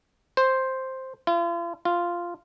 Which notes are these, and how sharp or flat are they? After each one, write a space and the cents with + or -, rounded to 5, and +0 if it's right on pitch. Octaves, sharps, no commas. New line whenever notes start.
C5 +5
F4 -40
F4 -5